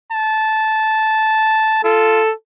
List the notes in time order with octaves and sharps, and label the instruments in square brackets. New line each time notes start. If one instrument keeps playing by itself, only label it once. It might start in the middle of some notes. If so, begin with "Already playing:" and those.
[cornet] A5
[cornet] F4 [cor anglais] A4